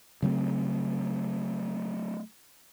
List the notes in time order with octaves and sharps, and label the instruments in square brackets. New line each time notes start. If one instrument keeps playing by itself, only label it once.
[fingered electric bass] C#3 F#3 A3 C4